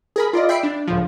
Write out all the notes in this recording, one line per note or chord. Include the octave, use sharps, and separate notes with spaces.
G#4 A#4 B5
F4 D5 D#5
E5 G5 B5 C7 D7
D4
C#2 A2 F3